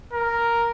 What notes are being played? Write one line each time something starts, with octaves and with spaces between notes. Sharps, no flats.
A#4